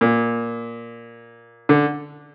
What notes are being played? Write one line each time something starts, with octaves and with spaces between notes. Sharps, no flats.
A#2
D3